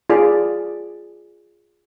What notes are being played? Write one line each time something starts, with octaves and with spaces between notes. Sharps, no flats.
F4 G#4 D5